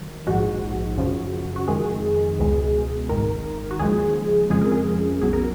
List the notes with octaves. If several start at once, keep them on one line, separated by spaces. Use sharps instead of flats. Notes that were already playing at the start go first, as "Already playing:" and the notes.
Already playing: D#3 F#3
A#1 G#2 F3 G#3 F#4
F#2 C#3 F3
F#4
F2 D#3 G#3 G#4
C#2 B2 G#3
G#1 G#2 D#3 A#4
F#4
D#2 C#3 F3 G#3 G#4
F2 C#3 F3 G#3 G#4
A#4
G#4
B1 B2 F#3 G#4
A#4